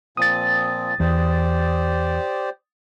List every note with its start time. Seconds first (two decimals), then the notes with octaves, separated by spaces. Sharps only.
0.17 A#2 F3 C4 D#6 A6
1.00 E2 G4 C5 D5